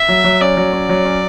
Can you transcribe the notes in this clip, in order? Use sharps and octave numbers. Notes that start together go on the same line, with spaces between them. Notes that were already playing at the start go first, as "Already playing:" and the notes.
Already playing: E5
F#3
F#3
C#4 D5
F#3
C#4
F#3
C#4